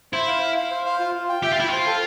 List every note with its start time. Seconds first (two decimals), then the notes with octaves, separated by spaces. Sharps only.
0.13 E4 C5
0.28 F5
0.43 F5
0.56 F5
0.71 C5
0.86 F5
1.00 F4
1.15 F4
1.29 G5
1.43 G4 E5
1.51 F4
1.58 E4 G5
1.69 F4 C5
1.86 A4